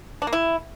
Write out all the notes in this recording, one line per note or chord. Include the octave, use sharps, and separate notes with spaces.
D4
A#3
E4